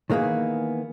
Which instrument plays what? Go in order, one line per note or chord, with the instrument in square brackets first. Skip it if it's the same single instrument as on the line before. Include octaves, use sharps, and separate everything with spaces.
[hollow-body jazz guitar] D#3 E3 A#3 B3 G#4